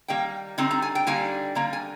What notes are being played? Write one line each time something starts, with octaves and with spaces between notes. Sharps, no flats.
D#3 G3 A#3 G5
D3 G3 C4 D#4
A#5
G#5
G5
D3 G3 A#3 D#4 G#5
D3 G3 A#3 A#5
G#5